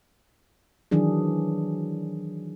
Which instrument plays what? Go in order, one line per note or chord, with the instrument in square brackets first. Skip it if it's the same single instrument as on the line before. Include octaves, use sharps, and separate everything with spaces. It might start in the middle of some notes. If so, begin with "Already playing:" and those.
[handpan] D#3 E3 F#3 D4 G#4